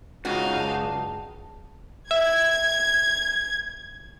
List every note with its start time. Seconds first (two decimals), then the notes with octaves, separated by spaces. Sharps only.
0.25 C#2 D#4 F#4 F5
0.55 F#2 D5 A5
2.11 E5 G#6